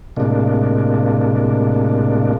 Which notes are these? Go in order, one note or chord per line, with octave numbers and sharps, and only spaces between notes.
A2 C3 G#3 A#3 D4